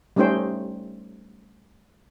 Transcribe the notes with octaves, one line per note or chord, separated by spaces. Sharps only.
G3 A3 C#4 D#4 C5 G5